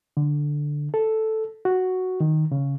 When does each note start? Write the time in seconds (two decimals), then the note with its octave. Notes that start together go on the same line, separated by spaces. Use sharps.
0.17 D3
0.94 A4
1.65 F#4
2.20 D#3
2.52 C#3